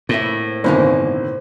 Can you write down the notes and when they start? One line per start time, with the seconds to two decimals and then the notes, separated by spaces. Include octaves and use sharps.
0.09 A2 A#3 C4 E4
0.64 G1 G2 C3 D#3 A#3 C#4 C5